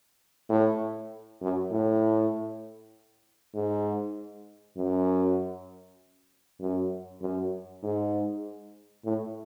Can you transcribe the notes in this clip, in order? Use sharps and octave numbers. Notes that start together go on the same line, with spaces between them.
A2
F#2
A2
G#2
F#2
F#2
F#2
G#2
A2